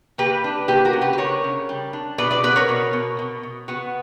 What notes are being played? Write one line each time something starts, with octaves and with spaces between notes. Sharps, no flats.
A#3 G4 B4
D4
A#3 G4 B4
F#4 A#4
C#3
G4 B4
B4
D4 A#4 C#5
C#3
G3
D4
B2 B4 D5
B4 D5
B3 B4 D5
A#4 C#5
B2
B2
B2
B2
B3 F#4